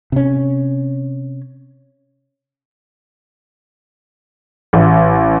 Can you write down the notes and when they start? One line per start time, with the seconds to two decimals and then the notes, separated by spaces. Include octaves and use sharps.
0.12 C3 C#4
4.73 A1